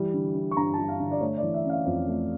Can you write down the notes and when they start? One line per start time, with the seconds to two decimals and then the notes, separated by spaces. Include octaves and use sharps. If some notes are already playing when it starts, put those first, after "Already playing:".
Already playing: E3 G3
0.14 D3
0.35 D4
0.51 C#6
0.56 G2 A#5
0.74 G3 A5
0.88 F5
1.00 D3
1.11 D5
1.21 A3 C#5
1.37 D5
1.43 E3
1.54 E5
1.65 C#4 F5
1.86 F2
2.08 A3